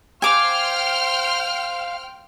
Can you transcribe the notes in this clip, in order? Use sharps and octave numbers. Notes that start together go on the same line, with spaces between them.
C5 F5 G5 G#5 C6 D6 F6